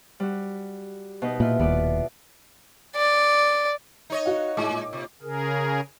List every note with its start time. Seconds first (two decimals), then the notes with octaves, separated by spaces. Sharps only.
0.20 G3 F#4
1.22 B2 D#4 B4
1.40 A#2 E4 F4
1.60 D#1 D#2 B3 B4 D5
2.96 D5
4.10 D#4 C#5 D#5
4.26 F#4 F5
4.57 A2 G#3 A5 D6
4.70 A#2
4.93 C3
5.22 C#3 G#4 A#4